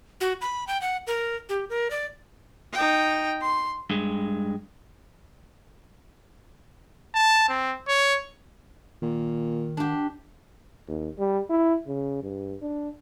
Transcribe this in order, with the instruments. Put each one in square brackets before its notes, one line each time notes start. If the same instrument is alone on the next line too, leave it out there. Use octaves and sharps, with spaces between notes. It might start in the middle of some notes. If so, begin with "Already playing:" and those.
[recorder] F#4
B5
G5
F#5
A#4
G4
A#4
D5
[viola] D#4 G5
C6
[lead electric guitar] G2 G#3
[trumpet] A5
C4
C#5
[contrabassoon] A#2 [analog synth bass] D#3
[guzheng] D4 G4
[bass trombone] D#2
G3
E4
C#3
G2
D4